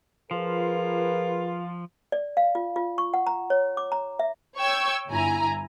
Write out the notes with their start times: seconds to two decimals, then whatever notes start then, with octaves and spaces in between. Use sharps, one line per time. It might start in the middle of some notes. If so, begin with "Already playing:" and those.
0.31 F3 F4 G#4 A#4 B4
2.12 D5
2.37 F5
2.55 F4
2.76 F4
2.98 C#6
3.14 F#5
3.27 A#5
3.50 C#5
3.77 D6
3.92 A#5
4.19 E5
4.58 C#5 G5 C#6 E6 G#6
5.09 G1 E4 G#5 A#5